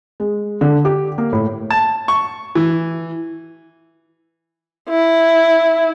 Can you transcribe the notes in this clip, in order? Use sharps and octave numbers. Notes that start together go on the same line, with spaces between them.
G#3
D3
G4
A#3
A2
A5
C#6
E3
E4